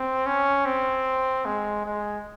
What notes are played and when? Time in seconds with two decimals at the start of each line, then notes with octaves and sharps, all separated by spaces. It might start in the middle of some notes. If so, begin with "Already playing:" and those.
Already playing: C4
0.26 C#4
0.66 C4
1.46 G#3
1.85 G#3